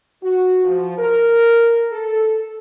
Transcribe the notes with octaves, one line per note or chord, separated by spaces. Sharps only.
F#4
F3
A#4
A4